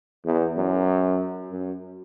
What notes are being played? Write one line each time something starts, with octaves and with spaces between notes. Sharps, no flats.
E2
F#2
F#2